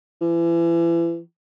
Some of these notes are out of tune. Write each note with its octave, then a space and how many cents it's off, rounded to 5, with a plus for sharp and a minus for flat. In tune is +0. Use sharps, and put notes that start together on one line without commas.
E3 +35